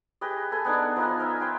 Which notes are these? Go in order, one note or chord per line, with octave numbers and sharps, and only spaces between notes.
G4 G#4 B4 D#5
A4 B4 G#5
B3 D4 D#4
F3 D#4 G#5
A#4 D#5 E5
B4 C5 G5